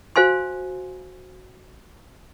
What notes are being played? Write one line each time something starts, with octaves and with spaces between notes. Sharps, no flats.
F#4 C5 F5 G#5 C6